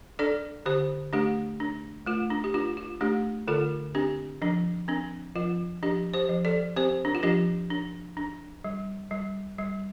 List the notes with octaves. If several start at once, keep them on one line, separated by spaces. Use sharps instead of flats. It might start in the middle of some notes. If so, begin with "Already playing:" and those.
D4 A4 D5
D3 G4 C5
A3 D4 G4
D4
A3 F4
D4
G4
D4 F4
F4
A3 D4 G4
D3 F4 A4
C4 D4 G4
F3 D4
C4 D4
F3 F4
F3 D4 G4
G4 C5
F3
A4 D5
C4 G4 C5
D4
F4
F3 D4 G4
D4
D4
G3
G3
G3